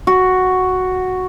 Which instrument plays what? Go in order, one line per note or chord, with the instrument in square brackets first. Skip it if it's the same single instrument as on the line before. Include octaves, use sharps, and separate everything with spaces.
[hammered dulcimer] F#4